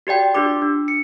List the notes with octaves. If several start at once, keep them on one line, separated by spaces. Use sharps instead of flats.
F#4 G4 D5 G5
D4 F4 G4 D6
D4
C#7